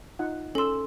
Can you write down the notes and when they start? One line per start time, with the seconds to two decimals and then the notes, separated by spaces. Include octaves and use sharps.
0.19 D#4 F4 F#5
0.55 C#4 A4 C6 E6